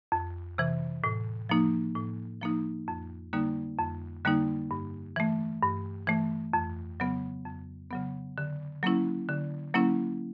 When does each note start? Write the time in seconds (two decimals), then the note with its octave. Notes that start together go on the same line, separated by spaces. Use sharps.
0.12 F2
0.58 C3 E3
1.04 A2
1.49 F3 A#3 D#4
1.95 A2
2.41 F3 A#3 D#4
2.88 F2
3.33 D3 G3 A#3 D#4
3.79 F2
4.25 D3 G3 A#3 D#4
4.71 G2
5.16 E3 A3
5.63 G2
6.07 E3 A3
6.53 F2
7.00 C#3 F#3 B3
7.45 F2
7.91 C#3 F#3 B3
8.38 D3
8.83 F#3 A#3 C#4 E4
9.29 D3
9.74 F#3 A#3 C#4 E4